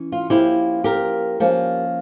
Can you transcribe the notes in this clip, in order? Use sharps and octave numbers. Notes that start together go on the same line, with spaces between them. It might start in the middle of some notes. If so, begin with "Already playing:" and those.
Already playing: E3 C#4
F4
F3 A#3 C#4 E4 G4
G4 A#4
F3 A#3 C#4